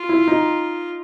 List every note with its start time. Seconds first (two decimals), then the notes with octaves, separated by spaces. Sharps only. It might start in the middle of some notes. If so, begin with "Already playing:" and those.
Already playing: F4
0.09 E4
0.28 D#4